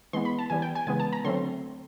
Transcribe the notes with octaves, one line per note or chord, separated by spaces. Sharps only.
E3 G#3 B3 C6
B5
A5
E3 G3 B3 G#5
G5
G#5
C#3 E3 G#3 B3 G#5
A5
A#5
D3 F#3 A3 C4 C6